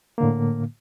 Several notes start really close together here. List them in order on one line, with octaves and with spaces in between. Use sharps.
A#3 D3 A2